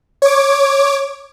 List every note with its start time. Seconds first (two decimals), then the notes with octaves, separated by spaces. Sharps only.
0.22 C#5 D6